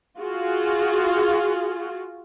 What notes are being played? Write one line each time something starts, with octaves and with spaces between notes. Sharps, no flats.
F4 F#4 G#4